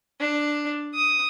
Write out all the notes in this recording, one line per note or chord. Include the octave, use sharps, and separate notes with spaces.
D4
D#6